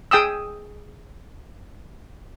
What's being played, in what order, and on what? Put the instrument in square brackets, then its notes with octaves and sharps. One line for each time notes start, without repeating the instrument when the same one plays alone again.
[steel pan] G#4 G5 D#6 E6